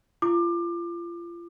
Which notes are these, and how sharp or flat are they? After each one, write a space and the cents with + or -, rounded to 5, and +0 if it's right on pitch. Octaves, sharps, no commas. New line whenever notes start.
F4 -30 D6 +25